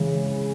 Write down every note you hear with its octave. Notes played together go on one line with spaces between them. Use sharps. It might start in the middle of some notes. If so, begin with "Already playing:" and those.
Already playing: C#3 E3 G#3